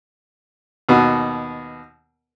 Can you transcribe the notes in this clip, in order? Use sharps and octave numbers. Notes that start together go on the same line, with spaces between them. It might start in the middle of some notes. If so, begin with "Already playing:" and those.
D#2 B2 B3